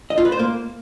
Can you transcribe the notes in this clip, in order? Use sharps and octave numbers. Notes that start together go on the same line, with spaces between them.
D#5
F4
B4
C5
A#3